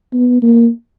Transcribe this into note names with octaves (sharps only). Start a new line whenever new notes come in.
B3
A#3